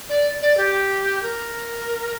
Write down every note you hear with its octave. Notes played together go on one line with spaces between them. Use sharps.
D5
D5
G4
A#4